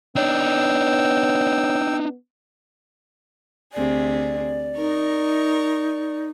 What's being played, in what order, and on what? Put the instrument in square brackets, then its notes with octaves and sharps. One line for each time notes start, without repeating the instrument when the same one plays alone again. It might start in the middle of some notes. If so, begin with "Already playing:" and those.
[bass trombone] B3 [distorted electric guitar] D4 D#4 [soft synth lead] C#5 [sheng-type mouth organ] G5 E6
[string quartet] D2 C3 G#4 [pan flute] D5
[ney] D#4 [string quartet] A#4 C#6